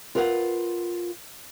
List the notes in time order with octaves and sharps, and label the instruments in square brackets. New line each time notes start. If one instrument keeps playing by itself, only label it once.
[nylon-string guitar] F4 A#4 B4 F5 F#5